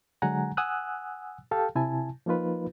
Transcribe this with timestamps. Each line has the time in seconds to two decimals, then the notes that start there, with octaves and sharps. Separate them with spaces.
0.22 D3 F#3 G#3 F#5 G#5 A#5
0.57 F#5 G#5 D#6 E6 F#6
1.51 G4 A4 F5 G5 A5
1.75 C3 E4 G#5 A5
2.26 F3 A#3 D#4 F4 B4